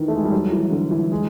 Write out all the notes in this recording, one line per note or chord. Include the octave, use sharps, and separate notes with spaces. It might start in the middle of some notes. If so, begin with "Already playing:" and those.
Already playing: D#3 E3
A3
G#3
G3
F#3
E3
D3
E3
G#3